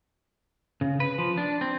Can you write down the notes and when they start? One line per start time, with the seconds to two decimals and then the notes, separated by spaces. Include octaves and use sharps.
0.81 C#3
1.00 B4
1.18 F3
1.38 D4
1.61 C4